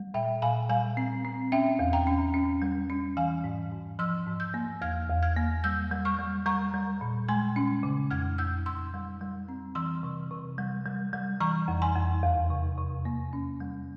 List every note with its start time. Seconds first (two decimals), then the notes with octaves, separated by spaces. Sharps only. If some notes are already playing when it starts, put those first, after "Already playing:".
Already playing: G3
0.14 A#2 E5 G5
0.42 A#2 F5 G#5
0.69 G3 F5 G#5
0.97 C4
1.25 C4
1.52 C#4 E5 G5
1.79 E2
1.93 G5 A#5
2.07 C#4
2.34 C#4
2.62 G3
2.90 C#4
3.17 E3 F5 G#5
3.44 G#2
3.72 G#2
3.99 F3 C6 E6
4.26 G#2
4.40 E6 G6
4.54 A#3
4.81 E2 F6 G#6
5.09 E2
5.23 F6 G#6
5.36 A#3
5.64 G3 E6 G6
5.91 G3
6.05 C#6 F6
6.19 G3
6.46 G3 A#5 C#6
6.74 G3
7.01 A#2
7.29 G#3 G#5 C6
7.56 C#4
7.83 C#3
8.11 F2 F6 G#6
8.38 F2 E6 G6
8.66 F2 C6 E6
8.94 G3
9.21 G3
9.49 C4
9.75 E3 C6 E6
10.03 C3
10.31 C3
10.58 G3
10.86 G3
11.13 G3
11.40 E3 A#5 C#6
11.68 F2
11.82 G#5 C6
11.96 F2
12.23 E2
12.50 C3
12.77 C3
13.05 A#3
13.33 C#4
13.60 G3